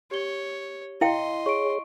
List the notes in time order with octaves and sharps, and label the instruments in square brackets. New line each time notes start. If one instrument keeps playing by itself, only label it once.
[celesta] G4 G7 [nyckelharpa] C#5
[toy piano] E4 F5 G5 [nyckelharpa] D#5 C6
[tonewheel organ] G#4 C#5 [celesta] C#6 D7